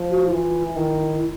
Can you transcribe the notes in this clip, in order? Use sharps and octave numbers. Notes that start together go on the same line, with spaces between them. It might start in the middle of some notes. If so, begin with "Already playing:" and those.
Already playing: F3
F#4
E4
E3 F4
D#3 E4